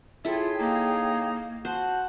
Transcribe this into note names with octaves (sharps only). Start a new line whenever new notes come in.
E4 F4 G#4 A4 C#5 G5
A#3 D#4
F#4 C5 A5